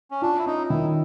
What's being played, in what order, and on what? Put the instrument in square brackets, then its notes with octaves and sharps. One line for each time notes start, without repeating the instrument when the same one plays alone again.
[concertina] C#4
[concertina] D4 [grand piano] F4
[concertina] E4
[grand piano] C#4 [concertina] D#4
[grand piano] D#3 [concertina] E4